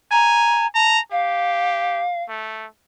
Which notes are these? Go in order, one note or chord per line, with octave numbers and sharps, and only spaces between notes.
G#5 A#5
A5 A#5
G4 F5
A3